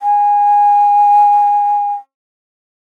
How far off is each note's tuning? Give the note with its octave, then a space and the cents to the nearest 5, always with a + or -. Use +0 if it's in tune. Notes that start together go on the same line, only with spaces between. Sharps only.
G#5 -20